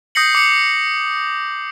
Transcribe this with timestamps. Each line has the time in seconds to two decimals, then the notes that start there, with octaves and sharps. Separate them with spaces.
0.15 D#6 G6 A#6 C7 C#7 F#7
0.35 D6 C#7